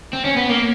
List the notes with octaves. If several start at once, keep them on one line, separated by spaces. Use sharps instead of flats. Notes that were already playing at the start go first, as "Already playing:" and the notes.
C4
C#4
B3
A#3